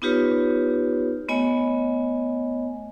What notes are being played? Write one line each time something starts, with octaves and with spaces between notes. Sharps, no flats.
B3 D#4 F4 G4 B4 C#5
A3 B3 C#5 D#5 G#5